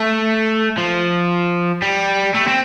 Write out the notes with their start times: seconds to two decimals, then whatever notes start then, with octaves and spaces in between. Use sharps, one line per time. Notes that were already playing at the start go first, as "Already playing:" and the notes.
Already playing: A3
0.78 F3
1.82 G3
2.34 A3
2.47 C4